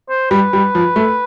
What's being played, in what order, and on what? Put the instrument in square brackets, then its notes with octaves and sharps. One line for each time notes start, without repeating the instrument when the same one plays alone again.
[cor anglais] C5
[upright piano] G3 [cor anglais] B4
[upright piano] G3
F3
A3